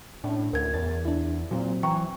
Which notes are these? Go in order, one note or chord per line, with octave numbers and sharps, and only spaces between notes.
A2 C#4 D4
D2 A#4 G#6
E2 A6
D4 E4
A#2 F#3 C4
E3 G5 A#5 C#6